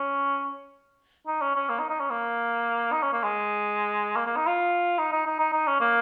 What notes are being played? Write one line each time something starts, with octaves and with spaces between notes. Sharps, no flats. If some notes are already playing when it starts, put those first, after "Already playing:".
Already playing: C#4
D#4
C#4
C#4
A#3
D#4
D#4
C#4
A#3
D#4
C#4
A#3
G#3
A#3
A#3
D#4
F4
D#4
D#4
D#4
D#4
D#4
C#4
A#3